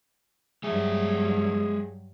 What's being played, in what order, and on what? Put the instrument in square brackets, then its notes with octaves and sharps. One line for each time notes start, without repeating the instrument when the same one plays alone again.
[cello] G2 F#3 [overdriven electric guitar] G#3 E5 [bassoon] G#4